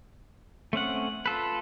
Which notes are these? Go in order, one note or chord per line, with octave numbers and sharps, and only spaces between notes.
A3 C4 C#4 F#5
F4 A4 B4